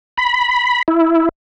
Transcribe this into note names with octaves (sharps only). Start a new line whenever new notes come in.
B5
E4